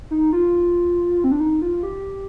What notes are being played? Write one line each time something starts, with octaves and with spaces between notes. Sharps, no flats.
D#4
F4
C4
D4
D#4
F4
G4